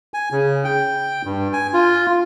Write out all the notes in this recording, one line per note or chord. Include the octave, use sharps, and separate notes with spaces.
G#5
C#3
G5
G2
G#5
F4